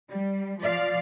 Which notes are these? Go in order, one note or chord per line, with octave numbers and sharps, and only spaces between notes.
G3
F3 D5 F5